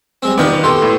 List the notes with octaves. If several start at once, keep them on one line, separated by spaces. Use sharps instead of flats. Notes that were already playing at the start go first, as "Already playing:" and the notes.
G3 G#3 C4
D#3 B3 F4 B4 D5
B2 G4 A4 C6
A2